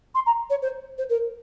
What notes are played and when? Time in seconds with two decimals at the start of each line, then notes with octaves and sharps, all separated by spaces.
0.14 C6
0.26 A#5
0.50 C#5
0.62 C5
0.98 C5
1.09 A#4